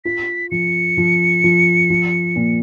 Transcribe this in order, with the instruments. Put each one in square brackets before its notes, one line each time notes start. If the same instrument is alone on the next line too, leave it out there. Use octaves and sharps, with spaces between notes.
[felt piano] F4 [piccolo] B6
[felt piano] F3 [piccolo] C#7
[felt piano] F3
F3
F3
A#2